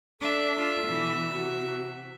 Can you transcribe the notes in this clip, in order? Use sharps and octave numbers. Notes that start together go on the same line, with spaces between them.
D4 A4 E5
D4 F4
B2 E3
C3 F#4